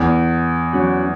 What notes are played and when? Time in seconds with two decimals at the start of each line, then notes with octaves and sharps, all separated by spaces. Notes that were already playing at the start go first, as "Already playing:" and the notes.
Already playing: E2
0.73 F#3 C#4 F#4